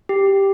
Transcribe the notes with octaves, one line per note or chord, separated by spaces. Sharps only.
G4